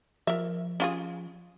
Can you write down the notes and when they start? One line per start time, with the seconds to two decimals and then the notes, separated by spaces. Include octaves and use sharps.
0.27 F3 A#4 E5
0.80 C#4 F4 G#4